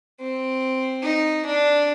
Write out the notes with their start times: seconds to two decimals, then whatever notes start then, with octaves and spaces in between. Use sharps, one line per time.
0.21 C4
1.03 D#4
1.46 D4